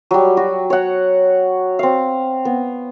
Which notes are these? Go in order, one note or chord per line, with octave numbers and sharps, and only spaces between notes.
F#3 G3
F#4
C#5 F#5
C4 F5
B3